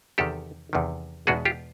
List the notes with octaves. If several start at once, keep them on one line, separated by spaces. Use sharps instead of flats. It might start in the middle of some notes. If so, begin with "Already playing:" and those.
E2 C3 D#3 G4 A4
E2 C3 D#3
E2 B2 G#3 B3 D#4 F#4 G#4
F4 G4